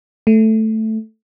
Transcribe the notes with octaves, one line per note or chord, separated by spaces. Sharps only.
A3